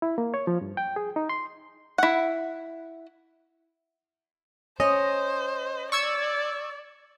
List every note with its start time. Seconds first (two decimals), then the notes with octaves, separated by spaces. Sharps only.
0.02 E4
0.18 A#3
0.34 C#5
0.47 F3
0.61 G2
0.77 G5
0.96 G#4
1.16 D#4
1.29 C6
1.98 E4 F#5
4.80 C#4 C5 D#5
5.92 D5 C#6 E6 G#6